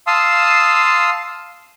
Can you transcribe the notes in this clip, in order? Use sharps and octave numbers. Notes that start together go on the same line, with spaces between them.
F5 A5 C6 D#6 E6